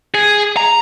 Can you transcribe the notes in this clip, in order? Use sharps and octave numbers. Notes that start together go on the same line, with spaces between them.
G#4
A#5